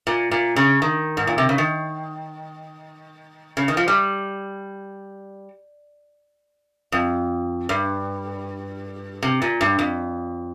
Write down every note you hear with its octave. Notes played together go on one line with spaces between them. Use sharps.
A#2
A#2
C#3
D#3
G#2
A#2
C3
C#3
D#3
C#3
D#3
F3
G3
F2
G2
C3
A#2
G2
F2